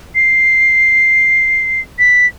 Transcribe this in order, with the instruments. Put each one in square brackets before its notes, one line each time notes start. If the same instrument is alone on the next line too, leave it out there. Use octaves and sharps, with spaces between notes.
[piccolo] C7
B6